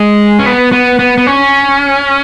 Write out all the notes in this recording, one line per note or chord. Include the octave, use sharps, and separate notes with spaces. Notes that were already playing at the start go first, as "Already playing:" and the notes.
Already playing: G#3
C#4
B3
B3
B3
B3
C#4